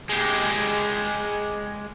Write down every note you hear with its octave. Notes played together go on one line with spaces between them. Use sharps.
G#3 G4